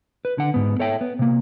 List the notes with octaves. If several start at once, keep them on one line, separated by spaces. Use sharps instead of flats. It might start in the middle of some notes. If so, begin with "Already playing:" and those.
B4
D3 F#5
G#2 B3
A4 C#5 E5 G5
B3
C3 A#3